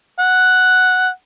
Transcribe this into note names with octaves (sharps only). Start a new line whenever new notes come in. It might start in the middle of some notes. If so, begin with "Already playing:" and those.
F#5